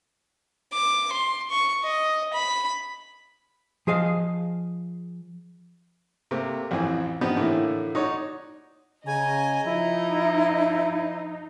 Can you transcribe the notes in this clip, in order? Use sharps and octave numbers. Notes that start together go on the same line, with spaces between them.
D6
C6
C#6
D#5
B5
F3 G#4 D#5 F5
C3 A3 A#3
A1 F2 E3 C4 G#5
F3 B3 D4 D#4 G4 B4
A2 D3 E3 A3 A#3
D#4 F#4 C#5 D5
C#3 D#5 G#5 A#5
F3 D#4 E4